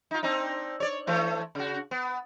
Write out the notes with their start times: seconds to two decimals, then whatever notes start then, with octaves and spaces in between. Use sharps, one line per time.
0.11 D#4 F4
0.23 C4 D4 D#4
0.80 C#5 D5
1.07 E3 A3
1.55 C#3 F#4
1.91 B3